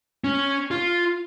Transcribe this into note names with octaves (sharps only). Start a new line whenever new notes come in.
C#4
F4